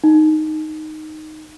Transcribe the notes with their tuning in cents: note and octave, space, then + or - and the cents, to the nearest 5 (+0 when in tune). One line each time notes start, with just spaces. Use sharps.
D#4 -5